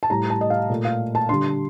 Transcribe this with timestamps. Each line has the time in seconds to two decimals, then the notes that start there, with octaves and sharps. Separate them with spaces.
0.03 A5
0.10 A2 G3 A#5
0.30 A5
0.41 D#5
0.50 F5
0.70 A#2 A3
0.85 F5
1.15 A5
1.29 D3 G3 C6